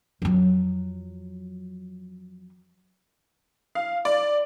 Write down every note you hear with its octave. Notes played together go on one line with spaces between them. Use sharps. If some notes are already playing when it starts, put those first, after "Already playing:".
F2 F#3
F5
D5